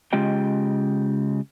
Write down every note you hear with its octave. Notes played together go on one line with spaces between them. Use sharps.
C#3 G#3 F4 G4 D#5 G5